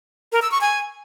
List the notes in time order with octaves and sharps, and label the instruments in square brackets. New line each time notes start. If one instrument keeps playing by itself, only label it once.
[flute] A#4
E6
C#6
G#5